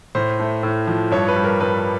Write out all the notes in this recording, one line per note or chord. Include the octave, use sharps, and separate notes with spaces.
A2 C5
A3
A2
F3
G2 C#5
B4
G3
A#4
G2 B4